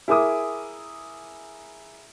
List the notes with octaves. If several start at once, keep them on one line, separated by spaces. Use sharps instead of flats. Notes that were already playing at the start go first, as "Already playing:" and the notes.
E4 G#4 A#4 D6 D#6